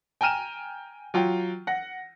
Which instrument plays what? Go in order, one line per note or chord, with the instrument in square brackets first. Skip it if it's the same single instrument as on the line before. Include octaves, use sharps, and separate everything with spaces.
[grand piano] G5 G#5 A#5 F6 D#7 E7
F#3 F4 G5
F#5 A#6